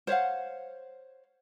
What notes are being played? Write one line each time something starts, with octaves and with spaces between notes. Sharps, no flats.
C5 C#5 F5 F#5